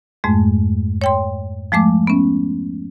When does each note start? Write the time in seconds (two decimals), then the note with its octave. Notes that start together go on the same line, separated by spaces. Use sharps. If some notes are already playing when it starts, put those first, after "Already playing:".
0.24 F2 G#2 G#3 A3
1.01 C#5 G5 C6
1.72 F3 G#3 A3 D6
2.07 B3 C#4